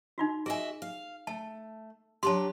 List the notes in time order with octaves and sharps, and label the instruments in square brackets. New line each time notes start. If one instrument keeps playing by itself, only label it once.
[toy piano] D#4 F4 F#4
[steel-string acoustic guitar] F#4 D#5 E5 [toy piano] G#4 G#5
[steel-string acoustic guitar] F5
[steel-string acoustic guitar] A3 [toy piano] A5
[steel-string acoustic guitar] F#3 D4 G4 [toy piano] A5 C6